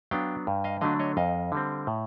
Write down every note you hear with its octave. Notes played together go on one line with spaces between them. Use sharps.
F#3 B3 D4 F5 G5
G2
D#5 F5
D3 F#3 A3 D4 D#5 F5
C#5 D#5
F2 D#5 F5
D3 G3 C4
A2